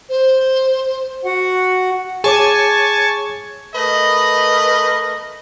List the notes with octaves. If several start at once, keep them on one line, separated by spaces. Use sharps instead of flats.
C5
F#4 F#5
G#4 C#5 G#5 A5 C#6 D6
A3 A#4 B4 D#5